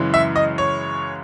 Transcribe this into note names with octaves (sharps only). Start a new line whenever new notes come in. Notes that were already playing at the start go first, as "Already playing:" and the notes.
Already playing: F#2 C#3 E3 G#3
E5
D#5
C#5